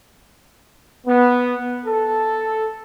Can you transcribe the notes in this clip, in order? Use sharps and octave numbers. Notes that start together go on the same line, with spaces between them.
B3
A4